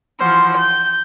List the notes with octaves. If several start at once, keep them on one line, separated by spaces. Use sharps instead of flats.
E3 F3 F#4 C5
G6